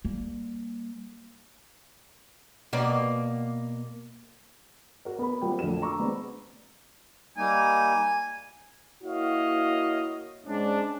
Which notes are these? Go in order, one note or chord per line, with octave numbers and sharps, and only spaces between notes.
G3 A#3
B2 A#3 D5
F#4 A#4
B3 A#4 B5
G3 A#3 C4 F4 F#4 G5
A#1 F2 D3 A3 A#3 E7
A#5 C#6 D6 E6
G#3 B3 C4 D4
G3 A#3 D#4 G#5
A#3 E4 F#4 C#5 D#5 F5
G#2 G#3 C#4 D4